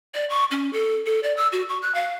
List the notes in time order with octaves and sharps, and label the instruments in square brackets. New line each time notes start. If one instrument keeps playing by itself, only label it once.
[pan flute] D5
C#6
C#4
A4
A4
D5
E6
F#4
C#6
F#6
F5